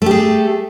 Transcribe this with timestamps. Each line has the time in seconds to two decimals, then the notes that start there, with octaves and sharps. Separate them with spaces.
0.02 A3
0.06 G4
0.11 G#4